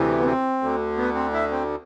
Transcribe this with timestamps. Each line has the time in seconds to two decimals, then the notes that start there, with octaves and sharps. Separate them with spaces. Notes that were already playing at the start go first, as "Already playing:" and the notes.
Already playing: D2 C3 E3
0.20 B3
0.26 C4
0.62 D2 D3
0.97 B3
1.15 C4
1.33 E4
1.51 C4